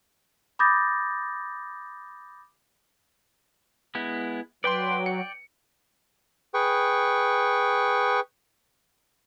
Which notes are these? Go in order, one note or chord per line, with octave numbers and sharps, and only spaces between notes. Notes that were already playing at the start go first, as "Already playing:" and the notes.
B5 D6 D#6 G6 A6 A#6
G#3 B3 E4
F#3 B4 D5 G5 C6
C#7
G#4 B4 G5 C#6